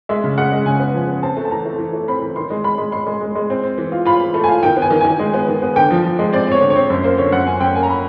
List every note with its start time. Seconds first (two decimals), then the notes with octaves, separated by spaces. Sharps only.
0.09 G#3 E5
0.24 C#3
0.38 G#3 F#5
0.52 G#3
0.66 C#3 G#5
0.80 B3
0.94 F3
1.08 B3
1.23 C4 A5
1.37 A3
1.45 A5
1.51 E3 A#5
1.65 A3
1.79 E3
1.93 A3
2.08 C4 B5
2.22 E3
2.36 D#3 C6
2.50 G#3
2.64 G#3 B5
2.78 G#3
2.92 G#3 C6
3.07 G#3
3.21 G#3
3.35 G#3
3.50 C4
3.63 C4
3.78 E3
3.92 F4
4.05 F4 B5
4.21 E3
4.34 A3
4.44 F4 G#5
4.63 D#3 G5
4.77 B3
4.82 G#5
4.91 D#3
5.01 D#3 G#5
5.19 G#3
5.34 B3
5.48 D#3
5.62 B3
5.76 D3 G5
5.91 F3
6.04 F3
6.19 G#3
6.33 C4 D5
6.47 C4 C#5
6.61 D3
6.70 C#5
6.76 C4
6.90 F#2 C5
7.03 A#3 C5
7.18 D3 C#5
7.32 F#2 F#5
7.46 F#2 G#5
7.60 F#2 G5
7.75 A#3 G#5
7.83 A#5
7.89 B5